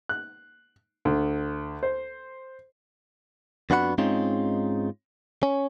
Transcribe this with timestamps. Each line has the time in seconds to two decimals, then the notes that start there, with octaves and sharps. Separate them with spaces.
0.09 F#6
1.05 D2
1.83 C5
3.70 F2 B3 D4 F#4 F#5 B5
3.98 G#2 G#3 C4 C#4 D#4 F4
5.43 C#4